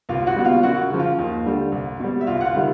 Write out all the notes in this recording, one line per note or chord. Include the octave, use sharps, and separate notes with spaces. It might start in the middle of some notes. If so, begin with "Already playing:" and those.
C2 F4 F5
F#4 F#5
B2 G3
F4 F5
F#2 F#4 F#5
C#3 F3
F4 F5
D#2
D3 G3
C2
B2 G3
E5
C2 F4 F5
F#5
F4 F5
C3 D#3 G3